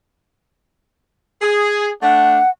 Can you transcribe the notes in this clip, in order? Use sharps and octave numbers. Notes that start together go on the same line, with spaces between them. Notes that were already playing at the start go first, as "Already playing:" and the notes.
G#4
A3 D4 F#5